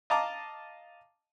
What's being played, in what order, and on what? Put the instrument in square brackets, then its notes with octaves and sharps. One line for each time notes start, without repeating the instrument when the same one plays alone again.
[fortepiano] D#5 F5 A5 A#5 D6